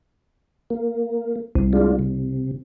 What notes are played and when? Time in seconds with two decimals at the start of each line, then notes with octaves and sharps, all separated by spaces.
0.70 A#3
1.55 C2
1.73 G#3 D4 F4
1.99 C3